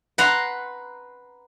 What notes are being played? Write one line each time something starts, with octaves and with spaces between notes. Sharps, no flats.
B4 F#5 A#5 C6